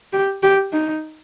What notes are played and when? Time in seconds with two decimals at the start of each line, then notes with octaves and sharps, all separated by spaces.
0.13 G4
0.43 G4
0.73 D#4